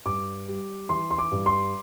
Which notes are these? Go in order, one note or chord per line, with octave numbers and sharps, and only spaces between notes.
G2 D6
G3
E3 C6
C6
D6
G2
C6